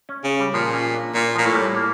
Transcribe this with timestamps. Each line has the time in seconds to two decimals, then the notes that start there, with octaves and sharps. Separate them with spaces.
0.09 C#4
0.24 C#3
0.39 G3
0.54 A#2 F3
0.74 C#4
0.94 D4
1.15 A#2 C#4
1.35 A#2 F3
1.45 A2 A3
1.55 G3
1.76 A#3